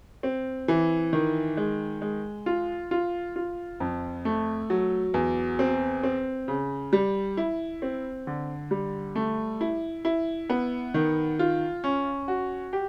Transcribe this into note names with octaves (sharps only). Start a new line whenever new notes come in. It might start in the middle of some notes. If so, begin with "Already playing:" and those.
C4
E3
D#3
G#3
G#3
F4
F4
F4
F2
A3
F#3
E2
C4
C4
C#3
G3
E4
C4
D3
G3
A3
E4
E4
B3
D#3
F4
C#4
F#4
G4